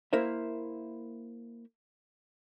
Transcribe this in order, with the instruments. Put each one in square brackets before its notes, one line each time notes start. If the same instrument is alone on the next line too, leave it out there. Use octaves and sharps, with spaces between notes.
[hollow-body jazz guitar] A#3 E4 A#4 C5 E5